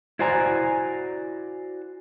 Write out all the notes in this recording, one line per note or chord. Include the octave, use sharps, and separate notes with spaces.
E4 F#4 C5 D5 G#5 A#5